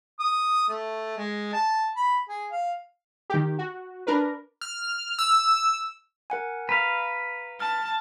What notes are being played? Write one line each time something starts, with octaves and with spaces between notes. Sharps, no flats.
D#6
A3
G#3
A5
B5
G#4
F5
D#3 G4
F#4
D4 A#4 B4
F6
E6
A#4 F#5 G#5
B4 F5 A#5
A5 F6